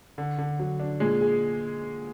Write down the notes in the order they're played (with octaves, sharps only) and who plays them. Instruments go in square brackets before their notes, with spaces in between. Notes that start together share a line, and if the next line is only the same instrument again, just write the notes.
[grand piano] D3
D3
F#3
D4
[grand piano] A#2 [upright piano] G#3
[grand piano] G#4